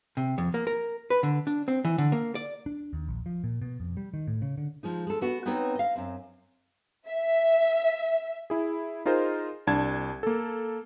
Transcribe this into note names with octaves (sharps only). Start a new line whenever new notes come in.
C3
F2
A#3
A#4
B4
D3
D4
C4
E3
D3
A#3
D5
D4
D#2
A#1
F3
A#2
B2
F2
G3
D#3
A2
C#3
D3
F3 G#3 D#4
G#3 A4
B3 F#4
B3 C4 D#4 B4 C#5
D#5 F5
F#2 C4
E5
E4 G#4
D#4 F4 G#4 A#4 C5
C2 D4 A5 G#6
A#3 A4